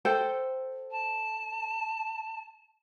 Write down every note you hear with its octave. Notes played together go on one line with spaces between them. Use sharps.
A4 C5 G5
A5